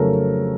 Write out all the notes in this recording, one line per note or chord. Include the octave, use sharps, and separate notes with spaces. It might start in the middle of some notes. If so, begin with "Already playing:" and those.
Already playing: F2 C#3 F#3 A3 A4 A#4